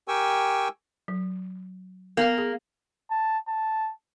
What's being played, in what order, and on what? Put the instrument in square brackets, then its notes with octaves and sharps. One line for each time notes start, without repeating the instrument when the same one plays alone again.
[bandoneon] G4 A#4 G5 G#5 C#6 E6
[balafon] F#3
[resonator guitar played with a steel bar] A#3 [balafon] B3 F5
[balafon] G#4
[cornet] A5
A5